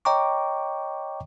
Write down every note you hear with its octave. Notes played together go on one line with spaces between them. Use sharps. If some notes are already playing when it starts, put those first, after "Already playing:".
C#5 D#5 G5 A#5 C#6 D6